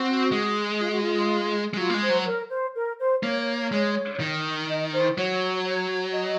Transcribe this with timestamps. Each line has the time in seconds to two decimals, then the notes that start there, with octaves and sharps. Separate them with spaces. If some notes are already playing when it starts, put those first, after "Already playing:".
Already playing: C4 F#4
0.32 G#3
0.80 F4
0.91 F#4
1.02 F4
1.74 G#3
1.77 F#3 F4
1.90 A#3
1.94 G#3
2.01 C5
2.09 F#3
2.26 A#4
2.50 C5
2.75 A#4
2.99 C5
3.23 A#3 C#5
3.72 G#3
4.20 D#3
4.69 D#5
4.93 C5
5.17 F#3 C#5
5.66 C#5
6.14 D#5